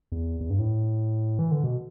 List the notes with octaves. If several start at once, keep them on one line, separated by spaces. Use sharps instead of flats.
E2
E2
G2
A2
E3
D3
B2